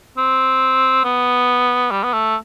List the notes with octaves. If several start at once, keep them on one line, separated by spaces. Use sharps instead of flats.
C4
B3
G3
B3
A3